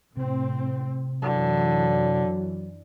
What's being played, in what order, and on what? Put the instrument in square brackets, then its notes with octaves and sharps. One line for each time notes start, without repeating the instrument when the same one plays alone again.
[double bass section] A2 C4 [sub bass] C3
[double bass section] F#2 E3 [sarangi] D3 [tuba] F#3